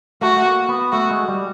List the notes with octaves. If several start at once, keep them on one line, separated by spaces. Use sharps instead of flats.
A3 F#4
A3
A#3
B3
A3 F#4
G#3
G3